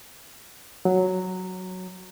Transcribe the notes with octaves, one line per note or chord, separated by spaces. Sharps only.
F#3